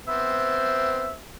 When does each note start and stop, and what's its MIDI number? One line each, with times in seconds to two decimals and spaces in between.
0.07 1.13 59
0.07 1.13 60
0.07 1.13 72
0.07 1.16 76